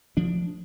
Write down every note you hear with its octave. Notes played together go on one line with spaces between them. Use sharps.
F3 A3 D4